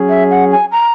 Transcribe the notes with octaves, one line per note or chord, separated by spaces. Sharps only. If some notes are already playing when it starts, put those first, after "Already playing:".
Already playing: F#3 C#4 G#4
E5
F#5
G#5
A#5